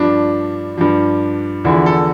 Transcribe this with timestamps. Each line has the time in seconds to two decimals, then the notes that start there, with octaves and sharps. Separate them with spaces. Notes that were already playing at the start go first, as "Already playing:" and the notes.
Already playing: G2 F3 D4
0.77 G2 F3
1.64 E2 D3 F3 E4
1.86 A4